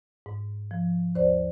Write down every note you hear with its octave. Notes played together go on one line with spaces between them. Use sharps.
G#2
F3
D#2 C5 D5